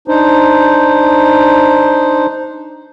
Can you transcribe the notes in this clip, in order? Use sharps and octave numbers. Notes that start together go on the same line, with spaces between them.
D4 D#4 C5